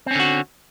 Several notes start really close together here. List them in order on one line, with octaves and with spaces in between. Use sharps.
C4 C#4 D3 F#4